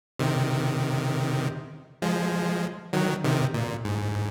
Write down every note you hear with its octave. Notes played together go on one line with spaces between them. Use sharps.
C3 D#3
F3 G#3
D#3 F#3
C3 D#3
A#2
G#2